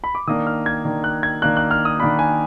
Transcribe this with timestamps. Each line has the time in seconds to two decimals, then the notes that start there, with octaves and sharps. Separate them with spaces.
0.04 B5
0.15 D6
0.27 D#3 A#3 D4 D#6
0.47 F6
0.66 G#6
0.85 D#3 A#3 D4
1.04 F#6
1.23 G#6
1.42 D#3 A#3 D4 F#6
1.57 F#6
1.71 F6
1.85 D#6
2.00 D#3 A#3 D4 B5
2.19 G#5